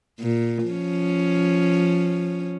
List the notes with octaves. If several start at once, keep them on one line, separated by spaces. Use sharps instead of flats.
A#2
F3 C#4